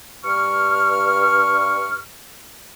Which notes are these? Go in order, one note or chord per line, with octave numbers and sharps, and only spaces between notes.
G2 C#6 F6